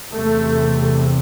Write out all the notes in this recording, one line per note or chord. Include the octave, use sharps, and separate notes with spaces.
E2 C3 A3